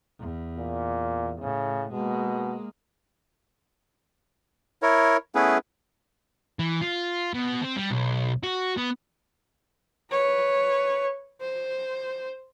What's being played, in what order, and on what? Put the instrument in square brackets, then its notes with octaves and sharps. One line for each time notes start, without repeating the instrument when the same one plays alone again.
[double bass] E2
[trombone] A#2
[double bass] A2 [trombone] C#3
[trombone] B2 [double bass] G#3 A#3
[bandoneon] E4 A#4 C#5
A3 B3 C#4 E4 G#4 B4
[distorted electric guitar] E3
F4
B2
C4
G3
B1
F#4
B3
[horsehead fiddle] B4 C#5
C5